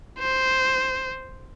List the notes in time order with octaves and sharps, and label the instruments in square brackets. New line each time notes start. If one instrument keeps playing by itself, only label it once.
[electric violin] C5